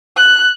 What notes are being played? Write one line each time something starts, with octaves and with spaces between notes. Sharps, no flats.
F#6